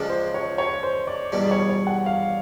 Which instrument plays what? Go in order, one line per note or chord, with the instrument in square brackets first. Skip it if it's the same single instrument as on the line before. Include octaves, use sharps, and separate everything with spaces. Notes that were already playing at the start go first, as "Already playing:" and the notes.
Already playing: [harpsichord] C#2 C#3 F3 G#3 [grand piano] D5
[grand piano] C5
C#5
C#5
C5
D5
[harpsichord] E2 B2 G3 [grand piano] D5
[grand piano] D5
C#5
C#5
F#5
F5